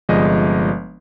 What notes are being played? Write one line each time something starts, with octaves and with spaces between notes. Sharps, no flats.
G1 C3 F3 G#3 D5 D#5